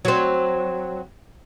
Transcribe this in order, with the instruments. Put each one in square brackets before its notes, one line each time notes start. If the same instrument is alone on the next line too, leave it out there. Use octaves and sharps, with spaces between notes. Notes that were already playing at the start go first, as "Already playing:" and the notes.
[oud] F#3 C4